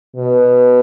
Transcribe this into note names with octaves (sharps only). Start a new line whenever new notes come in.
B2